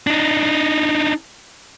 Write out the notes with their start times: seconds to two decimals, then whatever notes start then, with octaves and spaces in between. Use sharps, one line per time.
0.07 D4 D#4